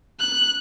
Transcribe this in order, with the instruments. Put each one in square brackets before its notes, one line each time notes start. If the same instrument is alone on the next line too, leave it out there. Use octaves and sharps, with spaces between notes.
[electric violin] F#6